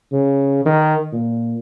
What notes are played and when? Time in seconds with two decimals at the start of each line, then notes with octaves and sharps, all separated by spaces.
0.12 C#3
0.66 D#3
1.12 A#2